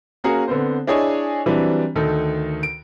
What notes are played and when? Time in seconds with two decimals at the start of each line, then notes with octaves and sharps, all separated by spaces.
0.24 A#3 C#4 F#4 G#4 A#4 F#5
0.48 D3 B3 C4 C5
0.87 D4 E4 G#4 C#5 D#5 G#5
1.46 E3 F#3 G3 C4 D4 E4
1.96 D2 D#3 A4
2.63 D7